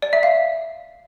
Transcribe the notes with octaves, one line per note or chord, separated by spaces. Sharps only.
D5
E5
F5